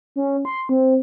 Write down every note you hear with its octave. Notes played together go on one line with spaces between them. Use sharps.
C#4
C6
C4